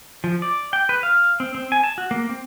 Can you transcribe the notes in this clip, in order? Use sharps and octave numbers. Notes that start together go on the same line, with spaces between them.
F3
D5
G5
B4
F5
C4
C4
G#5
A5
F#4
A#3
C4